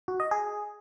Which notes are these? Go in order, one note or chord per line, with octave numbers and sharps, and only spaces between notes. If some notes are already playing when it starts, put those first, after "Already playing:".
F#4
D#5
G#4